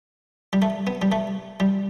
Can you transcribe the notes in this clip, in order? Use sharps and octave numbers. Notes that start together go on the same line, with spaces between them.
G3
A3
B3
G3
A3
G3